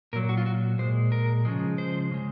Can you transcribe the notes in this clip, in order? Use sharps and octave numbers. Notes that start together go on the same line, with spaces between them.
A#2 F#3 A#4
F#4
F4
F#4
A#2 G#3 C5
A#4
C#3 F3 G#3
C5
C#3 G#3